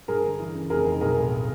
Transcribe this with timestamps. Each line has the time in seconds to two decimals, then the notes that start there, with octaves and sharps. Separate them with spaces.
0.08 G2 G#4 A#4
0.24 D3
0.39 E3
0.55 C#3
0.70 F1 G#4 A#4
0.86 D#3
1.01 B1 G#4 A#4
1.17 A2